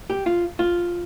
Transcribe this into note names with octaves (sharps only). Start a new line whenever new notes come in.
G4
F4
F4